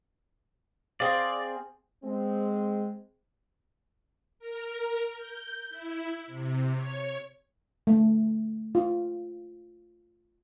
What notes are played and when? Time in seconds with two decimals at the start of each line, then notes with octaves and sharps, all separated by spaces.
1.00 C4 G#4 D5 F5
2.03 G#3 C4
4.39 A#4
5.17 G6
5.69 E4
6.27 C3
6.75 C#5
7.87 A3
8.75 F4